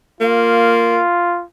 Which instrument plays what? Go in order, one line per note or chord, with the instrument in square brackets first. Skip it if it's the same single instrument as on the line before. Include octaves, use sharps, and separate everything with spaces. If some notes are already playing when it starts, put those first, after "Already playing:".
[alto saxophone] A#3 [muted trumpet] F4